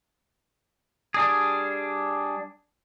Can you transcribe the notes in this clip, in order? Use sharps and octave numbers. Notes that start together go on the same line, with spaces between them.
G3 D4 G#4